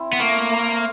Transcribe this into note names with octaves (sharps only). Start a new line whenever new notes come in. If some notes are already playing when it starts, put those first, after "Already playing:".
Already playing: C4 E4
B3
A3 A#3
A3